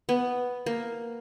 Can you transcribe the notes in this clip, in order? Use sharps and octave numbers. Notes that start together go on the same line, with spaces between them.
B3
A#3